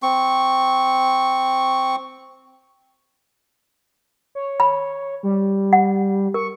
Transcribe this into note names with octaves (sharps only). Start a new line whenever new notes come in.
C4 C#6
C#5
B5
G3
F#5
A#4 C#6